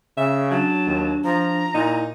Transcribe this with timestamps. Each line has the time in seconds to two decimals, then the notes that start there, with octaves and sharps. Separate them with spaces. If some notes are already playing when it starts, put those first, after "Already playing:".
0.17 C#3 E5
0.51 F#3 D4 A5
0.87 D#2
1.24 F3 A#5
1.74 A#2 D#4 E4